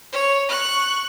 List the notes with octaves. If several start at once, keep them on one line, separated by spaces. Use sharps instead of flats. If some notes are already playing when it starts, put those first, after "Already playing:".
C#5
C#6 F#6